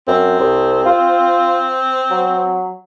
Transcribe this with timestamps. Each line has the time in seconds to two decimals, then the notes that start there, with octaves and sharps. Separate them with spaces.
0.08 F#2 C4
0.40 C2
0.86 F4
2.10 F#3